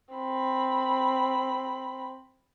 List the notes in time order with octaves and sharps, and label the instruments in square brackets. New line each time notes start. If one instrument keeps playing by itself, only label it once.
[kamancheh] C4 B5